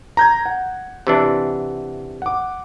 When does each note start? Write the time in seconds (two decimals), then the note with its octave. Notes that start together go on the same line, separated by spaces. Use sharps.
0.17 A#5 G6 G#6
0.46 F#5
1.07 C3 E3 D4
2.22 F#5 D6